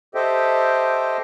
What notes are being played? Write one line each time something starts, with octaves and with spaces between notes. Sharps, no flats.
G4 A4 C5 D#5 E5 G5